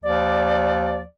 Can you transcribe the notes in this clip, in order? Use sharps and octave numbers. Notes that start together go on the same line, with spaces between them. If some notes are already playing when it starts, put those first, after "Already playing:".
D#2 F3 D5